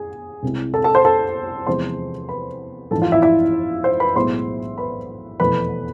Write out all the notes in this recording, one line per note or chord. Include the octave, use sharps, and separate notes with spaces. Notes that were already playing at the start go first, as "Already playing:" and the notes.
Already playing: G#4 G#5
C2 C3 G#3 C4 E4
A4 A5
A4 A5
C5 C6
A4 A5
E2 C3 F3 G#3 C5 C6
B4 B5
A1 G#2 F3 A4 A5
F4 F5
E4 E5
E4 E5
C5
B4 B5
B1 A2 G#3 B3 E4 C5 C6
B4 B5
F1 E2 B2 A3 B4 B5